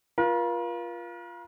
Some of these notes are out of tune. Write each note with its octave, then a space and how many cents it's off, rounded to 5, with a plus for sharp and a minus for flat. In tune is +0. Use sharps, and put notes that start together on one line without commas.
F4 -5 A#4 +45